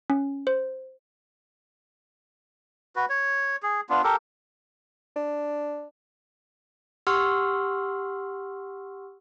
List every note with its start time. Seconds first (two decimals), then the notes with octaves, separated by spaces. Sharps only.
0.10 C#4
0.47 C5
2.96 F#4 B4
3.10 C#5
3.63 G#4
3.89 B3 D4 F4
4.03 G4 A4 A#4
5.16 D4
7.07 G4 F#5 C6 C#6 E6 F6